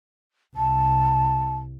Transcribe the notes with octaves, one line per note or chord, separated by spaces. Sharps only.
C2 A5